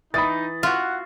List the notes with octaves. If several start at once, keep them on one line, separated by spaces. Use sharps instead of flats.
E3 D#4 B5 D#6 A6
F4 F#4 E5 F#5